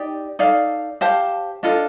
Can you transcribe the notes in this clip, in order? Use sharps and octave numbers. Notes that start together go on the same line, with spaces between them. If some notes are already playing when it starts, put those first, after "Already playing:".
Already playing: D#4 G4 D5
D#4 A4 D5 F5
G4 C5 F5 A5
D4 F4 A4 D#5